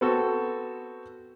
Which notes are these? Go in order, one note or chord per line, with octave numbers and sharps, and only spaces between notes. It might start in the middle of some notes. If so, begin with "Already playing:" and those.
B3 C4 F#4 A4